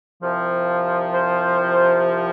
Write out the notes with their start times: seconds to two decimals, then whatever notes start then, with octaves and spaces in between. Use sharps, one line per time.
0.21 C2 C3 F3
1.13 C5